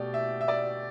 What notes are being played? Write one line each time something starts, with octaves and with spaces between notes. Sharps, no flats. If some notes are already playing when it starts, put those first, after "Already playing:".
Already playing: B2 A3 G4 D5
E5
E5
D5